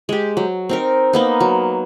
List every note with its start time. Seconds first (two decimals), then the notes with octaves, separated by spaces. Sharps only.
0.09 G#3 G4
0.37 F#3
0.69 C4 D#4 A#4
1.13 A#3 B3 D#4
1.40 F#3